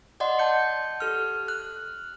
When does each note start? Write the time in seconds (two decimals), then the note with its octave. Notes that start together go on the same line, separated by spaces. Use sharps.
0.20 D5 D#5 F#5 C6
0.39 A5 G6 C#7
1.00 G4 A4 F6
1.48 F6 F#6